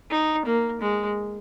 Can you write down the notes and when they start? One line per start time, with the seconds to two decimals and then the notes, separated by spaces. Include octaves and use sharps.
0.10 D#4
0.45 A#3
0.81 G#3